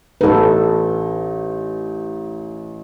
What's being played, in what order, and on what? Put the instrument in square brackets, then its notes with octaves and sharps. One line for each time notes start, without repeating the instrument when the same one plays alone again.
[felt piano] A1 D#4 [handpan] A4 B4